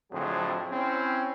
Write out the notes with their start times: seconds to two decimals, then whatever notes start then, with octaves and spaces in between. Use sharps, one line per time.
0.12 F2 A2 D3 F#3 C4 G#4
0.71 C4 C#4 E4